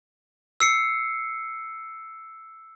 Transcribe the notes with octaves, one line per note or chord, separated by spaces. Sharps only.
E6 C7 C#7